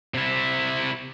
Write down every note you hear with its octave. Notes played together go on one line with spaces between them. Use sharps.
C3 E4